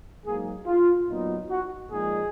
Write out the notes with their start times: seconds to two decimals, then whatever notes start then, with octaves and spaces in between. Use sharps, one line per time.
0.24 G#2 F#3 A#3 D#4 G#4
0.66 F4
1.08 A#2 F#3 B3 D#4
1.50 F#4
1.92 A#2 F3 G#3 D#4 G#4